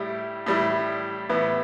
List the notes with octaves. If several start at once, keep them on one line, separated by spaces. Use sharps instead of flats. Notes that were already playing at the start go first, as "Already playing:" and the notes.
Already playing: A2 G3 E4
A2 G3 E4
A2 E3 B3 E4